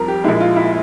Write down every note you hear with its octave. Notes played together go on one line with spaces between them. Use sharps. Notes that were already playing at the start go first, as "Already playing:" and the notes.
Already playing: F2 G3 A#4
G4
A#1 A#2 G#3 E4
F4
E4